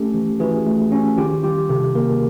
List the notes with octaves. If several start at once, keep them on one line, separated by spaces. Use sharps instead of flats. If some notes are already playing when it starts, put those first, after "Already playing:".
Already playing: A3 C#4 G4 A4
E3
E3 F#4 G#4
A3
C#4
D#3 F4 G4
G3 F4 G4
C3 G4 A4
A#3 G#4 A#4